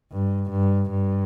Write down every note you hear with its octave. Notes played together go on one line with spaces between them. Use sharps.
G2
G2
G2